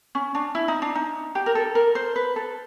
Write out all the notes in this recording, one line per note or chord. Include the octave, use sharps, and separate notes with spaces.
C#4
D4
E4
D#4
D4
D#4
G4
A#4
A4
A#4
C5
B4
A4